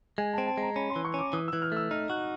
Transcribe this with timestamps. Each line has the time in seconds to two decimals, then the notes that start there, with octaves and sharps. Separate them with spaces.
0.18 G#3 G#5
0.33 A5
0.38 C4
0.47 A5
0.57 G#3 A#5
0.76 C#4 B5
0.90 C6
0.96 E3
1.05 C#6
1.14 C#4 D6
1.33 E3 D#6
1.48 E3 E6
1.62 F6
1.72 A3 E6
1.91 D#4 F6
2.10 F#4 F#6